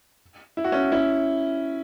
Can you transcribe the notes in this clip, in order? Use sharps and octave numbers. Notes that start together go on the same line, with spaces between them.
E4
F#4
C#4 E4
C#4 E4